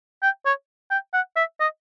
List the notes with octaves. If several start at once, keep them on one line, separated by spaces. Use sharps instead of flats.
G5
C#5
G5
F#5
E5
D#5